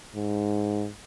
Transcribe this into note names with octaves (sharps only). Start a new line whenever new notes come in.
G#2